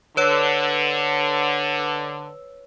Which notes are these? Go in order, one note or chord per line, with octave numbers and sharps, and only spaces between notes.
D3 B4 C#5 E6